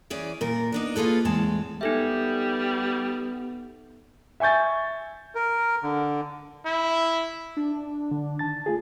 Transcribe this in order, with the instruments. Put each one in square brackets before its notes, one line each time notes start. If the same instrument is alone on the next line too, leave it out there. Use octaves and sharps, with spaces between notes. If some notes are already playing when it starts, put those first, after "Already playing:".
[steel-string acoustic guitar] E3 C#4 G#4 D5
A#2 F4 A#4
B3 D4 D#4
A#3 F4 G#4 A4 B4
E2 A2 G#3 C4 A5
[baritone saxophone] G3 [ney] B3 [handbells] D#4 A4 E5
[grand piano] E5 G#5 C#6 G6 A6
[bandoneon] A#4
D3
[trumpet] E4
[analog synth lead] D4
[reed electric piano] D3
D#3 A5 A6
A3 F4 G#4